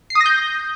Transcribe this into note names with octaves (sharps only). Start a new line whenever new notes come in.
C7
D#6
A#6
G6